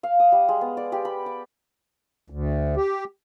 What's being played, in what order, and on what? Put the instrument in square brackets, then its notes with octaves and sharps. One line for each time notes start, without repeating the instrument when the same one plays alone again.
[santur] F5
D#6
G3
G#3
B3
D5
G4
B5
D6
[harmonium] D2
G4